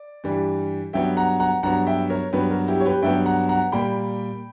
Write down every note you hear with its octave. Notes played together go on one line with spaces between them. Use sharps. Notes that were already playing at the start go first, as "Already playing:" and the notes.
Already playing: D5
G2 E3 G3
G2 F#3 B3 E5 G5
F#5 A#5
F#5 A#5
G2 F#3 B3 F#5 A#5
E5 G5
A#4 C#5
G2 F#3 B3 G4 B4
F#4 A#4
E4 G4
C#5
G4 B4
G2 F#3 B3 E5 G5
F#5 A#5
F#5 A#5
A#2 G3 A#3 G5 B5